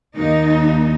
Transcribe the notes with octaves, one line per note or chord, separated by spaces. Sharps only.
D#2 D#4